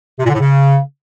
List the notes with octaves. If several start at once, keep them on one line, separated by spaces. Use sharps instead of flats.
C3
A#2
D3
A2
C#3